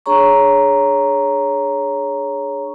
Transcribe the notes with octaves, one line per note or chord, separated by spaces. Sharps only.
D4 G#4 C#5 A#5 C#6